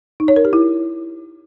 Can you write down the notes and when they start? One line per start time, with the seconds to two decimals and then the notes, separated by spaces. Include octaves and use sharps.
0.20 D#4
0.28 C#5
0.36 A#4
0.45 G4
0.53 E4